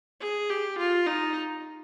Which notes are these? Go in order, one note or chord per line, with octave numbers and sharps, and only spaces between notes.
G#4
G4
F4
D#4